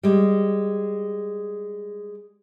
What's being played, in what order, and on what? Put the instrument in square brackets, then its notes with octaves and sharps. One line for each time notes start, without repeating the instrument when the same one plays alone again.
[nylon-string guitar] G3 G#3